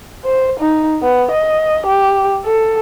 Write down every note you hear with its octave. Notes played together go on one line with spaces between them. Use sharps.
C5
D#4
B3
D#5
G4
A4